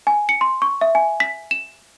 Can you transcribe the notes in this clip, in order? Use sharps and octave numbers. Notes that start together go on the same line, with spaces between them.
G#5
C#7
C6
C#6
E5
G#5
B6
E7